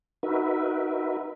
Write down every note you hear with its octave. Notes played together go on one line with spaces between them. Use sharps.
D#4 F#4 A#4 B4 E5